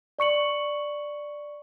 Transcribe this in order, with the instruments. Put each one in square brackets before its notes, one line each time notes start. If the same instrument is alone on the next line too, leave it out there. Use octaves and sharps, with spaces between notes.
[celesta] D5 C#6 C#7 F#7